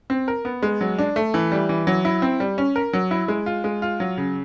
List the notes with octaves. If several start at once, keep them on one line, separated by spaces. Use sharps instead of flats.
C4
A#4
B3
G#3
F#3
D4
A3
E3
G3
E3
F#3
E4
C4
G3
C#4
A#4
F#3
E4
G#3
F4
G#3
F4
F#3
C#3